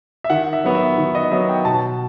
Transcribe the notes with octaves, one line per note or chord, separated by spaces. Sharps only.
E5
D#3 F#5
E5
F#3 B3
E5
D#3
D#5
F#3 B3 E5
G5
B2 A5